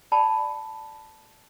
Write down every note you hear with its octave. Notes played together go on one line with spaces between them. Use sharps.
D5 G5 A5 B5